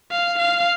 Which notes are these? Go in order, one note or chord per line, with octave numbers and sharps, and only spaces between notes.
F5
F5